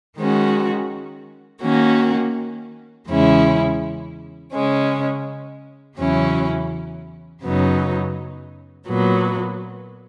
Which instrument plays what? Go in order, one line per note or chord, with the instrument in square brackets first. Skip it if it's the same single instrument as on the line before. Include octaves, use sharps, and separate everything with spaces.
[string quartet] D#3 G#3 C#4 F#4
D#3 A#3 C#4 F#4
E2 C#3 G#3 C#4 E4
C#3 G#3 C#4
E2 C#3 F#3 C#4 E4
F#2 C#3 F#3 B3 D#4
A#2 F#3 B3